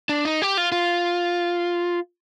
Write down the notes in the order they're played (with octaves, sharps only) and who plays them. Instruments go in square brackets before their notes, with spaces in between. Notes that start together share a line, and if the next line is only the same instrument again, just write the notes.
[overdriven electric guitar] D4
D#4
G4
F4
F4